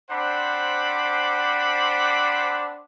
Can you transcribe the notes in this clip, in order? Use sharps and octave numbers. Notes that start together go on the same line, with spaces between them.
C4 D4 C5 F#5 B5 D6